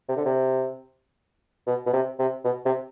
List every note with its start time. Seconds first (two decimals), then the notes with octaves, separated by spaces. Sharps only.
0.09 C3
0.17 D3
0.25 C3
1.67 B2
1.86 B2
1.93 C3
2.19 C3
2.45 B2
2.66 C3